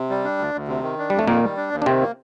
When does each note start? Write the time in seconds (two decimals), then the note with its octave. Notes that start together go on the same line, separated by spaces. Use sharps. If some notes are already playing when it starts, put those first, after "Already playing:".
Already playing: C3
0.10 G3
0.24 D4
0.38 D2
0.54 D2
0.68 C3
0.83 D#3
0.98 D4
1.10 F2 G3
1.19 A3
1.28 A#2 D#3 A#3
1.43 G3
1.57 D4
1.72 D#2
1.82 D4
1.86 C3 D#3 C4
2.01 A#3